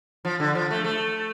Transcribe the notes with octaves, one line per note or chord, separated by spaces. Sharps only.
F3
D3
F3
A3
A3